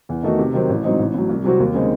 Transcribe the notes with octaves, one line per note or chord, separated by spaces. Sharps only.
E2
D#3 A3 D#4 F#4
C3
D#3 F#3 C4
A1
G#2 F#3 C4 D#4
A1
A2 F#3
C2
C3 F#3 C4 F#4
D#2
C#3 G#3 C4 D#4